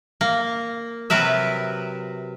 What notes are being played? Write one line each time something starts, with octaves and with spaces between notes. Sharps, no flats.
A#3
C3 F#3 A#4 B4 E5